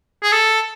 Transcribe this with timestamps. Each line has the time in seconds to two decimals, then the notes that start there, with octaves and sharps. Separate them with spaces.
0.23 G#4
0.32 A4